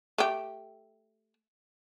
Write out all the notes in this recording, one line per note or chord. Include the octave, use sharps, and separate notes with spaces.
A3 G4